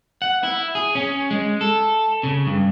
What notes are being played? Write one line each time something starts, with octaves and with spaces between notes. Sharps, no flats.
F#5
E4
G#4
C#4
G#3
A4
C#3
G2